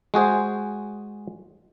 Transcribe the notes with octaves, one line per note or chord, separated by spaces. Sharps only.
G#3 F#4 G#4 C5